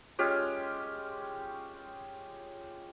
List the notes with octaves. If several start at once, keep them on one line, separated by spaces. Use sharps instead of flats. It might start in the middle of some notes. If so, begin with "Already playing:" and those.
G#3 C#4 F4 G4